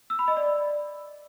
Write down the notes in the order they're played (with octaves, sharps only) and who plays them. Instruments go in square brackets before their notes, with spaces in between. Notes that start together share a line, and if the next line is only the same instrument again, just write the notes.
[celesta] E6
B5
D#5
D5